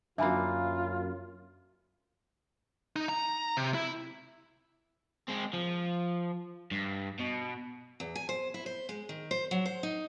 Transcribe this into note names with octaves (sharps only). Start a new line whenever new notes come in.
F#2 D3 E3 A#3 F4 E5 G#5 B5
D#4
A#5
C3
E4
G#3 C4
F3
G2
B2
E2
G#5
C5
E4
C5
G#3
D#3
C5
F#3
C5
D#4